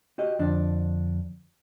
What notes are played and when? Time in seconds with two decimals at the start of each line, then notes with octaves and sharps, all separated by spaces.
0.18 F#4 G4 D#5
0.39 F2 D3 D4